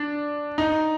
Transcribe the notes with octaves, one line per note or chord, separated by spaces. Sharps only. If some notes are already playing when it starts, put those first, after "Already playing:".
Already playing: D4
D#4